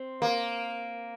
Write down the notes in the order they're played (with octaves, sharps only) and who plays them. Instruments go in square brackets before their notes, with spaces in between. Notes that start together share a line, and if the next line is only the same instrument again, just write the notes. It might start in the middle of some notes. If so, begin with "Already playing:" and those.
Already playing: [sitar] C4
A#3